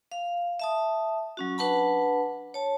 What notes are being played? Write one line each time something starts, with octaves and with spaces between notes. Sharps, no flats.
F5
E5 A5 D#6
F#3 C#4 F#4
D4 B4 F#5 A5 B5
C#5 A5